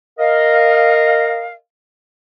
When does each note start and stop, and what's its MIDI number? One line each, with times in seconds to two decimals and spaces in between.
0.19 1.54 70
0.19 1.54 75
0.19 1.54 77